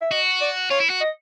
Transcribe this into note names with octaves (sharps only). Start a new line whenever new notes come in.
E5
F#4 D#5
D5
F4 C#5
E4
F#4
D#5